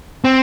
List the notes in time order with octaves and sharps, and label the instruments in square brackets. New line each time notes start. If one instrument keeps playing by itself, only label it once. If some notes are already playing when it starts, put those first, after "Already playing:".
[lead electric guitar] C4